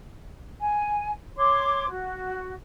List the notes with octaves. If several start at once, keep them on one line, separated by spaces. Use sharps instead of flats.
G#5
C#5 C6 D6 G#6
F#4